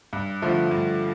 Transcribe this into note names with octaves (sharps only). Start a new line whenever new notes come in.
G2
D3 F3 A3
G2